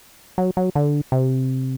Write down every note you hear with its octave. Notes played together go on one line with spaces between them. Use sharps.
F#3
F#3
D3
C3